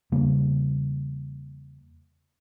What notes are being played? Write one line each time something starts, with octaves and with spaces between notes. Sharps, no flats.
E2 C#3 G3 A#3